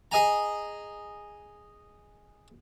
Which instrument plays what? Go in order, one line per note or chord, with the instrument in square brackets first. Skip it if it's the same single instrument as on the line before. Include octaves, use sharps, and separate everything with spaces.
[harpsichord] G#4 D#5 G#5 A#5